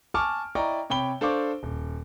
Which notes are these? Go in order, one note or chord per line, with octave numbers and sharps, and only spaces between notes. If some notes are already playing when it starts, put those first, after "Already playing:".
G#5 A5 C#6 D6 F6
E4 D5 D#5 G5 A#5 C#6
C3 C#5 G5 B5 G7
D4 A4 C5 F5 C#6 D6
D#1